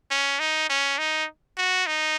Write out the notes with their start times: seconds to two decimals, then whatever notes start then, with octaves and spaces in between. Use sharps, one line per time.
0.11 C#4
0.39 D#4
0.70 C#4
0.99 D#4
1.58 F#4
1.87 D#4